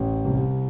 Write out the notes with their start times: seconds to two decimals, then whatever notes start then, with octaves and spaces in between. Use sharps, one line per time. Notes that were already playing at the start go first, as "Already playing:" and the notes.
Already playing: A1
0.25 C2